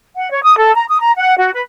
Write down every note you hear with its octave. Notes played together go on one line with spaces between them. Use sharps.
F#5
C#5
D#6
A4
A#5
D#6
A#5
F#5
F#4
B4